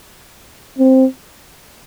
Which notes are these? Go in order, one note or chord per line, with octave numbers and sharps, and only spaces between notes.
C4